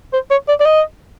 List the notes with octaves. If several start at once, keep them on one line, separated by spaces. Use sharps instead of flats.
C5
C#5
D5
D5
D#5